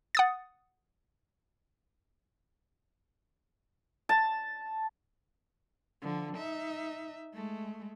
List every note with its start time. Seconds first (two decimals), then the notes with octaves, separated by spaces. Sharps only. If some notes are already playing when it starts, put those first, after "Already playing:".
0.15 F#5 D#6 A6
4.09 A5
6.02 D3 F3
6.36 D#4 E5
7.34 G#3 A3